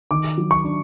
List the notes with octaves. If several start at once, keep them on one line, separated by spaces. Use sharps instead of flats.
D#3 D6
F#3
C#6
D4